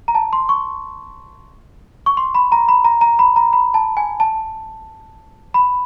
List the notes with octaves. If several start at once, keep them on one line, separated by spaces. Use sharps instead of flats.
A#5
A5
C6
C#6
C#6
C6
B5
A#5
B5
A#5
A#5
B5
A#5
B5
A5
G#5
A5
B5